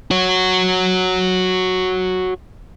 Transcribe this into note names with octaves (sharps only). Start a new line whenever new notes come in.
F#4 C#5